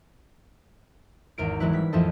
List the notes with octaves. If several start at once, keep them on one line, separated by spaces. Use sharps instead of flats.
G#1 E2 A#4 D7
E3 F#3 G#3 C4 E4 B4
G3 B6
A1 F2 E3 F3 A4 D#5